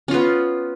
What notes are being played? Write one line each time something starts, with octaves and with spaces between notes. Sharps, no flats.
B3 C#4 F4